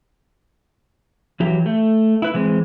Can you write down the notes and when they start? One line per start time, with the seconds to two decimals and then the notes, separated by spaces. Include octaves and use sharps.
1.40 E3 F#3 G4
1.66 A3
2.22 E4 B4
2.34 E3 G#3 C4